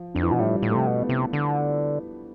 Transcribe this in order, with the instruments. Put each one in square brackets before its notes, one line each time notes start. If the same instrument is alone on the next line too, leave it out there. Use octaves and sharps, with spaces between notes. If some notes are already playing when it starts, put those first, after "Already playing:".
Already playing: [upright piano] F3
[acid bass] F2 [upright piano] D3
[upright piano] E3
[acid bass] B2 [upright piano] F3
[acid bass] A2 [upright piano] G3
[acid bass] A2
[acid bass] C3 [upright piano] A3
[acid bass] B2
[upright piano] B3
[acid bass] C3
D3